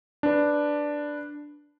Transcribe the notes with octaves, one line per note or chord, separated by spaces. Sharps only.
D4 B4